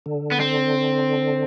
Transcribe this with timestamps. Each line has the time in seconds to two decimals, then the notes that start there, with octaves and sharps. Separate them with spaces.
0.06 D3
0.32 B3
0.40 C4